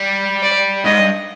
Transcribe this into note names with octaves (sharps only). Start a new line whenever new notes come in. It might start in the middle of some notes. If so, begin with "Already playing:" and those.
Already playing: G3
D5
G#2 D#5
G2